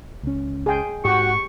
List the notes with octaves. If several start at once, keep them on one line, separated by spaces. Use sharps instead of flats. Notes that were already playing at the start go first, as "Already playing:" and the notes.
C#2 C#4
G#4 G5
G#2 F#4 G4 C#6